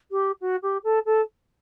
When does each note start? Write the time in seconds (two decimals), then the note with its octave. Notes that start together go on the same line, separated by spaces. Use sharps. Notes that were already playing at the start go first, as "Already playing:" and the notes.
0.11 G4
0.40 F#4
0.62 G4
0.83 A4
1.05 A4